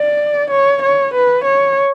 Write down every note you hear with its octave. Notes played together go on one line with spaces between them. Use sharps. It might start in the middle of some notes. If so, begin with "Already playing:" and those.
Already playing: D5
C#5
C#5
B4
C#5